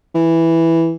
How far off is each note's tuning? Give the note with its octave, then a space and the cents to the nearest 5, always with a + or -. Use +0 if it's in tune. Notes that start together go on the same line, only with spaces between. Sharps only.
E3 +0